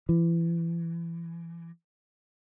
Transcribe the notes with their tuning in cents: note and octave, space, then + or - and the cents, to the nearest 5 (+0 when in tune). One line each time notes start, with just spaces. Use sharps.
E3 +30